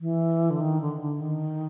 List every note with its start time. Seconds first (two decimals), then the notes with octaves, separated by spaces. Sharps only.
0.01 E3
0.50 D3
0.61 D#3
0.81 D3
1.01 D3
1.21 D#3